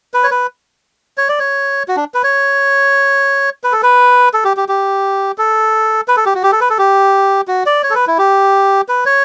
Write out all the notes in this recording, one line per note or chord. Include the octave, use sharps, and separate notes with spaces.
B4
C#5
B4
C#5
D5
C#5
F#4
D4
B4
C#5
B4
A4
B4
A4
G4
G4
G4
A4
B4
A4
G4
F#4
G4
A4
B4
A4
G4
F#4
D5
C#5
A4
B4
E4
G4
B4
C#5